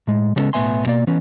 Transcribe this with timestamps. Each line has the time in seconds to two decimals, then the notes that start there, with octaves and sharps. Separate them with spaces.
0.07 A2 G#3
0.36 C#3 G3 G#3 B3 C#4 A4
0.53 B1 A2 B3 E5 G#5 C6
0.86 B2 A#3 D5
1.07 E3 B3 C#4